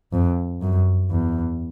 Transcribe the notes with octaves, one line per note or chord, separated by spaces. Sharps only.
F2
F#2
E2